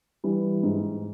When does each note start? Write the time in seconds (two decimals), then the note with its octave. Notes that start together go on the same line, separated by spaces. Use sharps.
0.24 E3 G3
0.63 G#2